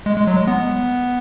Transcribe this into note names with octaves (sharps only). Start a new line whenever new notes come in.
G#3
G#3
F#3
G#3
B3